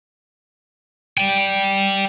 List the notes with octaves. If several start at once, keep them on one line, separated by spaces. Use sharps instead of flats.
D5 G5